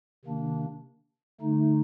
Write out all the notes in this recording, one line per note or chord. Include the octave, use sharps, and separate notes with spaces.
C3 D#3 A#3 D4
D3 A3 D#4